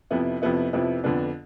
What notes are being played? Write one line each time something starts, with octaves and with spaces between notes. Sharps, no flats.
F2 C3 F3 B3 E4
F2 C3 F3 B3 E4
F2 C3 F3 B3 E4
F2 D3 F3 B3 D4